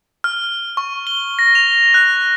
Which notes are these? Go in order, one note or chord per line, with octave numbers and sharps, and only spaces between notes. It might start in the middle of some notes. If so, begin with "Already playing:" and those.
F6
C#6
G7
A#6
F7
F#6